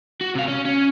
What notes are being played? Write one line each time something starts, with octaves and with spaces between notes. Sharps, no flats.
F#4
C3 F5
C#4
C#4